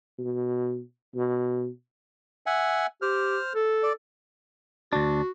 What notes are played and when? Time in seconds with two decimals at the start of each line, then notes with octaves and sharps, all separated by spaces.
0.19 B2
1.16 B2
2.46 E5 F#5 G#5
3.02 G4 C5 F6
3.55 A4
3.83 D5
4.93 D2 D4 F#4